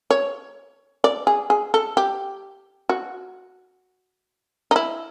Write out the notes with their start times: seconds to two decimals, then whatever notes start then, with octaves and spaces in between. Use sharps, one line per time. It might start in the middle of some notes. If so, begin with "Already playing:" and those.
0.11 C#5
1.04 D5
1.27 G#4
1.50 G#4
1.74 A4
1.97 G4
2.89 F#4
4.71 D#4
4.76 E4